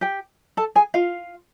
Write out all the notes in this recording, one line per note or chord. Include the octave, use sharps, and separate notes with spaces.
G4 G5
A4 A5
G#4 G#5
F4 F5